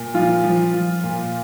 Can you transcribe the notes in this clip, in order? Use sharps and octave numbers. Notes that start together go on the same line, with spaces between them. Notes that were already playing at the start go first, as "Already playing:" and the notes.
Already playing: A#2
F3 F4
F3
F3
A#2